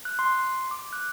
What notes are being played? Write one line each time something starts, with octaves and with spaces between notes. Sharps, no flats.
F#6
C6
D6
F#6